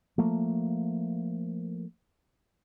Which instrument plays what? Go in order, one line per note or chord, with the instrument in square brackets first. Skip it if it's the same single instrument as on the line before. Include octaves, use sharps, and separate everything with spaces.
[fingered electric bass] F3 A3 A#3